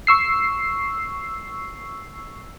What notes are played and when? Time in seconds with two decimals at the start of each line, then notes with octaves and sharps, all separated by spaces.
0.07 C#6 E6 C7